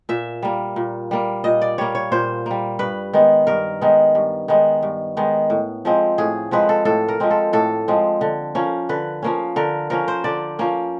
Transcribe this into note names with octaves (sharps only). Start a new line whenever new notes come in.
A#2 E5
G3 A#3
A#2
G3 A#3
A#2 D#5
D5
G3 A#3 C#5
C#5
A#2 C5
G3 A#3
G2 B4
D#3 G#3 B3
G2 A#4
D#3 G#3 B3
G2
D#3 G#3 B3
G2
D#3 G#3 B3
A2
F3 G#3 C4
A2 G#4
F3 G#3 C4 B4
A4
A2 A4
A#4
F3 G#3 C4
A4
A2 A4
F3 G#3 C4
D3
F3 A#3 C#4
D3 B4
F3 A#3 C#4
D3 A#4
F3 A#3 C#4 A#4
C5
D3 D5
F3 A#3 C#4